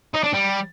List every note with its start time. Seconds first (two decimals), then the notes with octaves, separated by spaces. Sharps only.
0.14 D#4
0.24 D4
0.33 G3